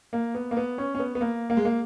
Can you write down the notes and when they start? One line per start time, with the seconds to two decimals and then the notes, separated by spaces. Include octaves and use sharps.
0.13 A#3
0.35 B3
0.51 A#3
0.57 B3
0.78 C#4
0.95 C#4
0.99 B3
1.15 B3
1.21 A#3
1.50 A#3
1.57 G#3
1.65 A#3